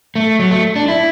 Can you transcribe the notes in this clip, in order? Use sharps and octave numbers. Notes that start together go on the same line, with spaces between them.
A3
F#3
A3
D4
E4